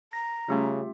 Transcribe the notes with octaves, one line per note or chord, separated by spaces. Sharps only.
A#5 A#6
C#3 G3 A3 C#4 F4 G4 E5